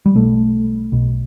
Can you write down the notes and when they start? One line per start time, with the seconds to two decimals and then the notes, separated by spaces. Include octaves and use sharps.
0.06 G3
0.14 B1 B2 A3
0.92 B1 B2